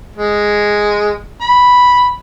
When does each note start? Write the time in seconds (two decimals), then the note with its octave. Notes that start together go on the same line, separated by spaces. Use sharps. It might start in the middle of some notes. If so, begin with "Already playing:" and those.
0.16 G#3
1.41 B5